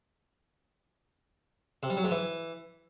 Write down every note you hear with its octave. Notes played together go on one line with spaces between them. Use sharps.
C3
G3
F#3
G#2
E3